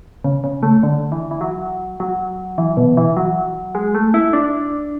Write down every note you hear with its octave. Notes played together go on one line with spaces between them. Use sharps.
C#3
C#3
A3
D3
E3
E3
F#3
F#3
E3
B2
E3
F#3
G#3
A3
E4
D4